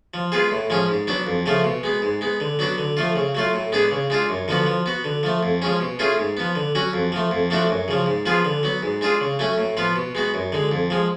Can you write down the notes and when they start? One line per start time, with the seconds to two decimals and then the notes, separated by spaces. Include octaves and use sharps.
0.14 F3
0.32 G#3 B3 F4 G#4
0.51 A2
0.70 F3 G#3 C#4
0.89 G#2
1.07 F#3 B3 D4
1.27 F2
1.46 C#3 F3 A3 F4
1.64 B2
1.83 G#3 B3
2.02 G#2
2.21 G#3 B3
2.40 D3
2.59 F#3 B3 D4 F#4
2.78 D3
2.97 F3 A3 F4
3.16 C#3
3.35 F#3 A3 F4
3.53 A2
3.72 G#3 B3 D4 G#4
3.91 C#3
4.10 G#3 D4 F4
4.29 F#2
4.48 D3 F3 B3 F#4
4.66 F3
4.86 B3 F#4
5.04 D3
5.23 F3 A3
5.43 F2
5.62 F3 G#3 C#4
5.80 B2
5.99 A3 C#4 F4 G#4
6.18 G#2
6.37 F3 B3
6.55 D3
6.75 F#3 C#4 F#4
6.93 F2
7.12 F3 A3
7.31 F2
7.50 F3 A3 D4 F#4
7.69 F#2
7.88 C#3 F3
8.06 G#2
8.26 F3 B3 F4 G#4
8.45 D3
8.63 F#3 B3
8.83 G#2
9.01 G#3 D4 F4 G#4
9.20 C#3
9.39 F#3 A3 C#4
9.58 A2
9.77 F3 B3 F4
9.96 B2
10.15 G#3 B3 F#4
10.34 F#2
10.52 D3 G#3
10.72 F2
10.90 F3 G#3